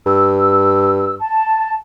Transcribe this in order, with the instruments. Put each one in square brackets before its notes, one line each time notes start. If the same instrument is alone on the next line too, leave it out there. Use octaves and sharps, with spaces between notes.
[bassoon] G2 [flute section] E6
[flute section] A5